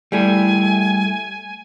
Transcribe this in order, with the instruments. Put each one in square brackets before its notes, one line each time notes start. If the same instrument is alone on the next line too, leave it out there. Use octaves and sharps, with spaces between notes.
[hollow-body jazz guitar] G3 A3 E4 [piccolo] G#5